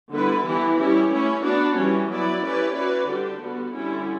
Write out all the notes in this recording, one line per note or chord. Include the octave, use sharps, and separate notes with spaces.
D3 G3 B3 E4 B4
E3 B3 E4 G4
G3 C#4 E4 G4
A3 C#4 E4
B3 D4 F#4
E3 G3 C#4
F#3 B3 E4 B4 D5
C#4 E4 G4 B4 D5
C#4 F#4 B4 D5
D3 G3 D4 G4
D3 G3 B3 F#4
D3 G3 C#4 E4